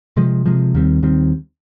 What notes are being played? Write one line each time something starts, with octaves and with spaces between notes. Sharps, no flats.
C3 F3 G#3
C3 F3 G#3
D#2 D#3 G3 C4
D#2 D#3 G3 C4